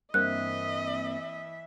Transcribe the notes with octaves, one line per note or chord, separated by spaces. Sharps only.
G2 E3 A#3 C4 D#5 E5 F#6